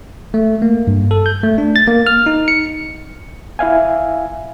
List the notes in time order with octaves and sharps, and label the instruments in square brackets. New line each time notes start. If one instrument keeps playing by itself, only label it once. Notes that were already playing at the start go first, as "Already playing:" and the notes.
[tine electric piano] A3
A#3
G2
A4
G6
A3
D4
A6
A#3
F6
D#4
C#7
[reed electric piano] E4 E5 F5 G#5